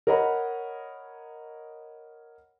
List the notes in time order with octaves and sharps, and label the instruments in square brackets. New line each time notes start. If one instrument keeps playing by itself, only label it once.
[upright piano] A#4 C#5 D#5 F#5 A#5 B5